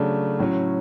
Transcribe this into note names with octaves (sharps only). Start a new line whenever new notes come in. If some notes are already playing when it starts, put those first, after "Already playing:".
Already playing: C#3 F#3 A3 D4
A2 F#3 C#4